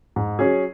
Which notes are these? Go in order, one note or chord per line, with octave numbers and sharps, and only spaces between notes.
G#2
F#3 C#4 G#4